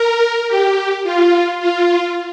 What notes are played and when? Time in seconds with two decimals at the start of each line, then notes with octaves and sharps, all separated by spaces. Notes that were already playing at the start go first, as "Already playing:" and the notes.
Already playing: A#4
0.48 G4
1.04 F4
1.60 F4